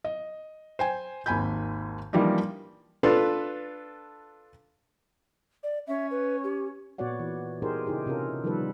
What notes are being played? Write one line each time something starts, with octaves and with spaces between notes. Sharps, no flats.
D#5
C5 G5 G#5
G#1 D#2 G#5 B5 G6
E3 F3 G3 A#3 D4 D#4
D4 F4 A4 B4
D5
C#4 E5
B4
G4
A#2 B3 F#4 C#5 D5 F#5
E3
B3 D#4 G4 G#4 A#4 C5
C#3 D#4 E4 G4 G#4
C3 C#4 F4 A4 A#4
D#3 F3 G3 B3 A4 B4